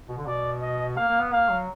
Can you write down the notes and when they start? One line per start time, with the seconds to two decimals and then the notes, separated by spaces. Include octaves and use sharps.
0.09 B2
0.18 D3
0.27 B2 D5
0.61 D#5
0.97 A#3 F5
1.08 A#3
1.20 B3
1.32 A#3 F5
1.49 F#3